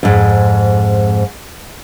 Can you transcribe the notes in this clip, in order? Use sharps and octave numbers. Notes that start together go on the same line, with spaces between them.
F2 G#2